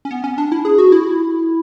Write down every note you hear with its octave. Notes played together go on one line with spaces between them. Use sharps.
C#4
B3
C#4
D4
E4
G#4
F#4
E4